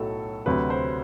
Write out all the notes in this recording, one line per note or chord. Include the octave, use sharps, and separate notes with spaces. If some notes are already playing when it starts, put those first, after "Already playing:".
Already playing: B1 A2 F#3 A4
D2 C3 F#3 B4
C5